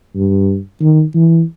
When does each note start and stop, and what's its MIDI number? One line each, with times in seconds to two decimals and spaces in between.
0.16 0.58 43
0.82 1.04 51
1.15 1.43 52